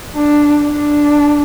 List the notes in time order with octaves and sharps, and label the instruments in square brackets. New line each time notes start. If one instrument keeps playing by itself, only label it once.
[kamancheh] D4
D4